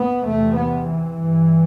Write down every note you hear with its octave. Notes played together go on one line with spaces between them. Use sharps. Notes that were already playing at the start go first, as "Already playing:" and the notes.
Already playing: B3
E2 C3 A3
B3
E3
G2